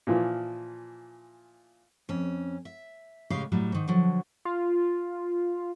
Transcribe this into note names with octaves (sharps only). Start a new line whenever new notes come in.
A#2 E3 F3
F2 C#4
E5
A2 C#3 G#3 C#4 G4 F5
A2 F#3 G3
G#2 D#3
D3 F3 F#3
F4